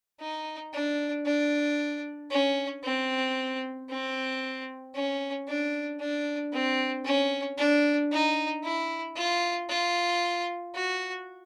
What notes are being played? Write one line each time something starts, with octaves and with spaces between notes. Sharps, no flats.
D#4
D4
D4
C#4
C4
C4
C#4
D4
D4
C4
C#4
D4
D#4
E4
F4
F4
F#4